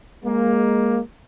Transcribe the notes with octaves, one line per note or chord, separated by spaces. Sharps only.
G#3 A#3